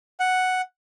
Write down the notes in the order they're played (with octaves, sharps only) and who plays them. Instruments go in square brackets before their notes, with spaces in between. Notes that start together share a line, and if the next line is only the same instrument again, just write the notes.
[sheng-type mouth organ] F#5